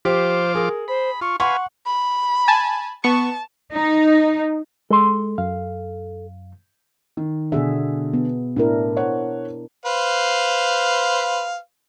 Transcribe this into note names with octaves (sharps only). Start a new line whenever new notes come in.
F3 F4 G4 C5 D6
G#4 A#4
C5 B5
F4 C#6
B4 F5 F#5 G#5 C6 C#6
B5
G#5 A5
B3 A5 C#6
D#4
G#3 A4 C6
F#2 F5
D#3
B2 D3 G#4 E5
B3
A2 D4 E4 A#4
C5 C#5 F#5
B4 C5 F5